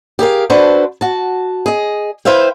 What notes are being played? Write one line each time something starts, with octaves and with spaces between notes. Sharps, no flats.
G4 G#4 A#4 F5
D4 F#4 A4 B4 C5
F#4 A5
G#4 D#5
E4 B4 C5 E5 F5 G5